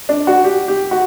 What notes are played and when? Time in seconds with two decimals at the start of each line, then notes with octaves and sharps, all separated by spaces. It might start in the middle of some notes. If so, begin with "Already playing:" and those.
0.09 D4
0.27 F#4
0.44 G4
0.68 G4
0.91 F#4